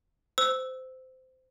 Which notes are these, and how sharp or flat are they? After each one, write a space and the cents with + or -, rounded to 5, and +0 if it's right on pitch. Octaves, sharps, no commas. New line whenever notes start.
C5 -20 E6 -10